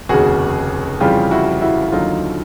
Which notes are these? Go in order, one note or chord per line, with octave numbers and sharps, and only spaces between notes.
F1 D#2 C#3 F#4 G#4
F2 C#3 E3 G3 F4 G4
E4 F#4
E4 F#4
D#2 D3 F#3 D#4 F4